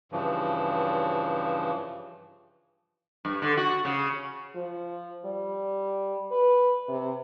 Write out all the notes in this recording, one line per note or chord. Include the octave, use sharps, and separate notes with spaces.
G2 C#3 E3 F3
G2
D3
F#4
C#3
F3
G3
B4
C3